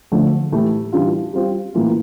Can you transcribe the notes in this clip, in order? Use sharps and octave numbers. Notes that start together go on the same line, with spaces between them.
D3 F3 A3
A2 E3 A3 E4 G4
E3 G3 D4 F4
G3 C4 F4
A2 E3 A#3 F4